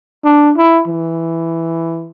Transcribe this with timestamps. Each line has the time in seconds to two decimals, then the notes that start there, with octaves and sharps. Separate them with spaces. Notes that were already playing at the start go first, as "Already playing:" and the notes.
0.24 D4
0.57 E4
0.88 E3